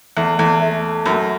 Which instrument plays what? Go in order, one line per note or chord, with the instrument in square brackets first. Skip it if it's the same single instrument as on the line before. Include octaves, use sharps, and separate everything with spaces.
[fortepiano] E2 [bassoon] A3
[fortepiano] E2 [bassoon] A3
[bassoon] A3
[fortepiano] F#2